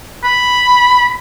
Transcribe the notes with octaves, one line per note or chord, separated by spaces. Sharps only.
B5